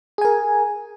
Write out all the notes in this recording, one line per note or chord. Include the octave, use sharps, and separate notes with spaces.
G#4 A#4 G#5